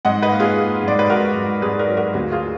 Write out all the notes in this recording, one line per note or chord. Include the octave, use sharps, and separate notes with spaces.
G#2 D#5 F#5
B4 D#5
A#3
F4 G#4
A#3
G#2 D5
B4
G#2 F#4 A#4
G#2
G#2 G#4 B4
A#4 D5
F#3
F#4 A#4
D2 F#4
F4 G#4